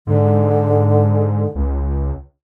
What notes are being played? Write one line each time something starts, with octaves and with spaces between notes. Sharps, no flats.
G#2 D3
C#2